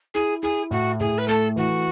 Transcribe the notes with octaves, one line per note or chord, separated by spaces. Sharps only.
E4 G#4
E4 G#4
A2 F#4
A2 G#4
B4
A3 A4
E3 F#4